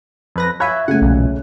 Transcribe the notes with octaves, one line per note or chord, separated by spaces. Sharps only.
F2 B4 A#6
C#5 E5 F5 G#5 B5 F#6
C#3 A3 F#5 G#5
B1 E2 A#2